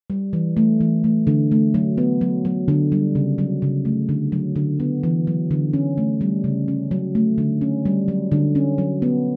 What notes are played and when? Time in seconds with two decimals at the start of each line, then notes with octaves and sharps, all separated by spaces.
0.10 G3
0.33 E3
0.57 A3
0.81 E3
1.04 A3
1.27 D3
1.52 A3
1.74 F#3
1.98 B3
2.21 F#3
2.45 F#3
2.68 D3
2.92 G3
3.15 C#3
3.38 F#3
3.62 C#3
3.85 A3
4.09 D3
4.32 F#3
4.56 D3
4.80 B3
5.03 E3
5.27 F#3
5.51 D3
5.73 C#4
5.98 A3
6.21 G3
6.44 C#3
6.68 C#4
6.91 F#3
7.15 A3
7.38 D3
7.61 C#4
7.85 G3
8.08 F#3
8.32 D3
8.55 C#4
8.78 F#3
9.02 B3